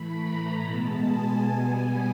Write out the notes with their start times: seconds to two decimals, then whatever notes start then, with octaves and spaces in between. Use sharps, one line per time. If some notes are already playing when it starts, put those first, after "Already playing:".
Already playing: A2 E3 A3 B5
0.19 A#5
0.60 B2 G#3 B3 A5
1.01 G#5
1.43 B2 G3 B3